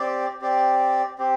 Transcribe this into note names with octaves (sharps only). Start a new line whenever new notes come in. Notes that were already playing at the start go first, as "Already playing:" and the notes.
Already playing: C4 G4 D5
C4 G4 D5
C4 G4